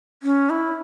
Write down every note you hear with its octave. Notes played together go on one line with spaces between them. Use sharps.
C#4
E4